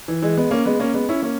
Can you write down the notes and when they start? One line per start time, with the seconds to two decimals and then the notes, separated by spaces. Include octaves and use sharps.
0.08 E3
0.22 E3 G#3
0.37 G#3 B3
0.51 A#3 C#4
0.65 G#3 B3
0.80 A#3 C#4
0.94 G#3 B3
1.09 C#4 E4
1.22 A#3 C#4